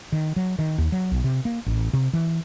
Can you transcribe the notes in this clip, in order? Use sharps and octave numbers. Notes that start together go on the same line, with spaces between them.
D#3
F#3
D#3
D#2
F#3
B1
C3
A#3
A1
C3
E3